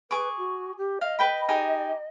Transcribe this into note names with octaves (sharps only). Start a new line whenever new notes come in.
G#4 B4 C#6 D6
F#4
G4
D#5 F5
B4 G5 B5
D#4 G4 G#4